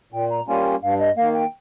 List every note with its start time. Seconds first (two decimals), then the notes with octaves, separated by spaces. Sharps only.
0.12 A#2 G5
0.30 A#5
0.48 G3 A#3 C#4 F4 G#5
0.82 G2 F5
0.99 D#5
1.17 D#3 A#3 F5
1.35 G5